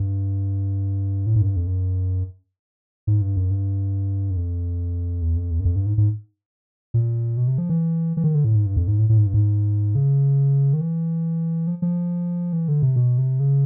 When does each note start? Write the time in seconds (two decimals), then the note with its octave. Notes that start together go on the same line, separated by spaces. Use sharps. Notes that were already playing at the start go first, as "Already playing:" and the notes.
Already playing: G2
1.26 A2
1.36 G#2
1.41 F#2
1.46 G2
1.56 F2
1.67 F#2
3.07 G#2
3.21 G2
3.36 F#2
3.51 G2
4.31 F#2
4.36 F2
5.22 E2
5.36 F2
5.51 E2
5.60 F#2
5.65 F2
5.76 G2
5.86 G#2
5.98 G#2
6.94 A#2
7.37 B2
7.48 C3
7.58 F3
7.69 E3
8.17 E3
8.24 D#3
8.35 D3
8.44 A2
8.55 G#2
8.66 G2
8.76 F2
8.88 G#2
8.99 A2
9.09 A2
9.18 G#2
9.26 G2
9.34 G#2
9.95 C#3
10.73 D#3
10.81 E3
11.67 F3
11.82 F3
12.53 E3
12.68 D3
12.82 C3
12.96 B2
13.18 C3
13.40 C#3